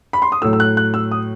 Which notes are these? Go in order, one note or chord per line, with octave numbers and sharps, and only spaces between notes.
B5
C6
D#6
A2 F#3 A3 E6
E6
F#6
F#6
E6
D#6